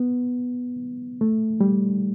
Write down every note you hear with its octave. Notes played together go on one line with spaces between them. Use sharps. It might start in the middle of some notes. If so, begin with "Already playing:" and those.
Already playing: B3
A3
G3